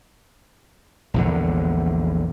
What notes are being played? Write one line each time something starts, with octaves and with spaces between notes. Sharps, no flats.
A#1 E2 D3